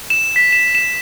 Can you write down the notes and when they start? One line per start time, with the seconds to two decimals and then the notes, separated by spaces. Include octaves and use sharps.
0.10 E7
0.36 B6
0.52 E7
0.75 E7